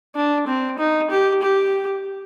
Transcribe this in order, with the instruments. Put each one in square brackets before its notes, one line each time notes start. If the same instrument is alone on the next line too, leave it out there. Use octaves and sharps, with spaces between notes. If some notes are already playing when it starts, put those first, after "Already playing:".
[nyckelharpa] D4
C4
D#4
G4
G4